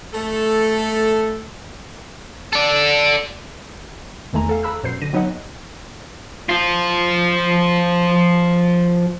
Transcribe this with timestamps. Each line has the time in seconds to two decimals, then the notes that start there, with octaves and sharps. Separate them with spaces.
0.14 A3 A4
2.53 A4 D5
4.33 G1 E2 D#3 A3 G#5 A#5
4.49 A4 F5
4.63 A4 A#5 B5 E6 F#6
4.83 F#2 B2 C5 G6 C7
5.02 D3 A#6 D#7
5.13 F#3 B3 D#4 C#5 D#5 F#5
6.49 F3 F4